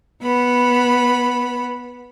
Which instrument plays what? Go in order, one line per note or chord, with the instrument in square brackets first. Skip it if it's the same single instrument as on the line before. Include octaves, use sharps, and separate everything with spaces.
[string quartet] B3 B5